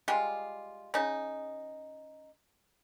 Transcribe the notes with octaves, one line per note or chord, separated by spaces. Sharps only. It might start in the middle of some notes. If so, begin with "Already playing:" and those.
G3 G#3 F4
C#3 D#4